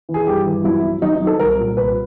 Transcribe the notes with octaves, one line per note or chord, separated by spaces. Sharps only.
E3
G#4
G2 G4
E3
F#3 E4
F#3
F#3 D#4
D#4
F#3
A4
C2 A#4
A#2
C2 B4